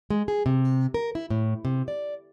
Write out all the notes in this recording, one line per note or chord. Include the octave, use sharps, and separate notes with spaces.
G#3
G#4
C3
A#4
E4
A2
C3
D5